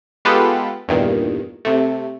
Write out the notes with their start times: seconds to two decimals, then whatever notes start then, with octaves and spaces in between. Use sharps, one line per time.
0.25 G#3 B3 F4 G4 A4 B4
0.88 E2 G2 A#2 D#3
1.65 C3 A3